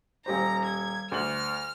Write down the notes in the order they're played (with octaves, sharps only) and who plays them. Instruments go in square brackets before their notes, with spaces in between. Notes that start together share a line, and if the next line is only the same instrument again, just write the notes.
[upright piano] D#1 G4 C5 [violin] A#5
[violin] G#6
[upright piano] D2 F#7 [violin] F6